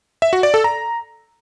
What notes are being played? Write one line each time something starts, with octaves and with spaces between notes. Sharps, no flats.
E5
F#4
D5
A4
A#5